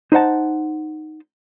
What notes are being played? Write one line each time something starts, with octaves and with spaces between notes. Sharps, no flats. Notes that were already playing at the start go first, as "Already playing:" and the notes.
D#4 C5 D#5 F#5 A5